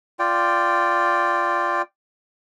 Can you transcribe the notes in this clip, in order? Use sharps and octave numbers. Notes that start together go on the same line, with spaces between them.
F4 D5 G5